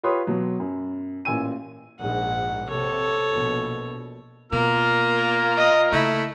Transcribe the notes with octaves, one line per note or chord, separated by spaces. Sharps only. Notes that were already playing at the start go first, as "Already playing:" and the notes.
F4 G4 B4 C#5 C6 D#6
B2 F#3
F#2
A1 A#2 G#5 E6 D#7
A#1 G#2 F#5
C3 A4 C#5
A#1 B2
B2 A#3 F4 A#5 F6
D#5
C#3 A3 A#3 E4